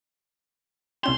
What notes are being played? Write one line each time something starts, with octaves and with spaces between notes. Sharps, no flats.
C2 C#4 G4 C6